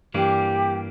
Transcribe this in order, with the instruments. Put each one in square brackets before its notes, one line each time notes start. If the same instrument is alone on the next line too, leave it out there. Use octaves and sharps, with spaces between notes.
[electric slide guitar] G2 E3 G3 A#3 D4 [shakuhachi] G4